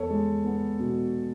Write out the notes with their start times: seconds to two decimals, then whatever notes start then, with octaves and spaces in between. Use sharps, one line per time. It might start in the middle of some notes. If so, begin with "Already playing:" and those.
Already playing: E2 A4 C#5
0.10 G#3
0.44 B3
0.79 B2